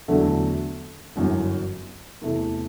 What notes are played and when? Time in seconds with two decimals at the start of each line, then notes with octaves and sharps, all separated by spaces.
0.08 E2 D3 F#3 A3
1.16 G1 F#2 E3
2.21 E2 C3 E3 A3